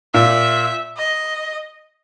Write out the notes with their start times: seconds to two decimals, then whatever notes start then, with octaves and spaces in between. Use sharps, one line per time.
0.14 A#2 E5
0.97 D#5